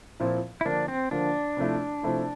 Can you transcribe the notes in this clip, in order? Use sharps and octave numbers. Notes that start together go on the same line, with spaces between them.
A#2 F3 C4 E4
E4
D3 F3 A#3 D4
C4
D3 F3 A#3 D4
C3 F3 A3 E4
C3 F3 A3 E4